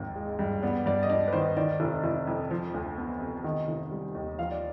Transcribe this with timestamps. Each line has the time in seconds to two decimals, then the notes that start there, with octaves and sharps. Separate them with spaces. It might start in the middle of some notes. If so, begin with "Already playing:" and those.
Already playing: G#1 D#2 F3
0.16 G#3
0.39 G2
0.63 B3 D5
0.86 G2 D5
1.03 D#5
1.10 D4 D5
1.28 B4
1.33 D#3 C5
1.57 D#3 D5
1.80 F1
2.04 F1
2.27 F2
2.51 F3
2.74 D2
2.97 B3
3.21 C3
3.44 D#3
3.68 F1
3.91 G3
4.15 D#2
4.38 F3 F5
4.51 D5